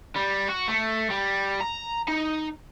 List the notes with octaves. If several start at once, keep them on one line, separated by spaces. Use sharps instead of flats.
G3
F#4
A3
G3
A#5
D#4